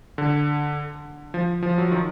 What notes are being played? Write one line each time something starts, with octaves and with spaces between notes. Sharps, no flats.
D3
F3
F3
F#3
D#3